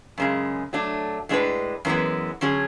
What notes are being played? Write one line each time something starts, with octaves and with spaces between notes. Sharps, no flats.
F#2 C#3 G#3
F#3 A3 D4
A2 G#3 D4 G#4 B4
F#2 E3 G#3 B3
D3 F#3 C#4 G#4